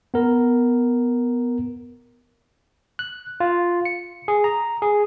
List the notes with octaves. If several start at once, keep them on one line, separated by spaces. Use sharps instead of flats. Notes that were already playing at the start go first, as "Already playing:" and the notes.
B3 A#4
F#6
F4
C#7
G#4
A#5
G#4